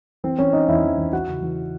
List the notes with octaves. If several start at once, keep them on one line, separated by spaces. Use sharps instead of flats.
E3 C4 C5
E3 C#4 C#5
E3 D#4 D#5
E2 E4 E5
E2
E2
E3 F#4 F#5
C#3
E3